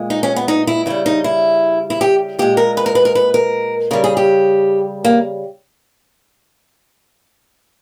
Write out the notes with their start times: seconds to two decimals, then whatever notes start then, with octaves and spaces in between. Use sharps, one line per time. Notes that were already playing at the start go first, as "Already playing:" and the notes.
Already playing: A#2 G#3
0.10 D#4
0.23 C#4
0.36 B3
0.48 D#4
0.67 E4
0.86 C#3 G3 E4
1.06 D#4
1.24 E4
1.90 E4
2.01 G4
2.39 A#2 G#3 G4
2.57 A#4
2.77 B4
2.86 A#4
2.95 B4
3.05 A#4
3.15 B4
3.34 A#4
3.91 C#3 G3 A#4
4.04 G#4
4.17 G4
5.05 A#3